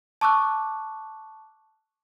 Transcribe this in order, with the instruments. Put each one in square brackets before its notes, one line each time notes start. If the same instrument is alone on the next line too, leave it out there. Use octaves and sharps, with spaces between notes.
[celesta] A5 C#6 D6 E6 F#6